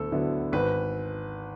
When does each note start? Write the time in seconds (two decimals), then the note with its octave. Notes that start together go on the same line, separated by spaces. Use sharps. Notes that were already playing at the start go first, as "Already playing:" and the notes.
Already playing: D2 D3 F#3 B3 E4 A4
0.12 D3 F#3 B3 E4
0.52 G#1 B4